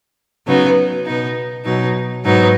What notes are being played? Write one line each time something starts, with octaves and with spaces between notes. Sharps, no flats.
C#3 F#3 B3 D#4
B2 B3 D#4
B2 F#3 D#4
G#2 F#3 B3 D#4